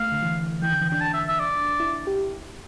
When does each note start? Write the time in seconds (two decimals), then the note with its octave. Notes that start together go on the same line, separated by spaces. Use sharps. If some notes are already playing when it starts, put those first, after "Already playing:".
Already playing: A3 F5
0.12 D3
0.22 E3
0.62 E3 G5
0.72 D3
0.81 E3
0.89 D4 G5
1.01 A5
1.14 E5
1.28 E5
1.40 D5
1.80 E4
2.07 G4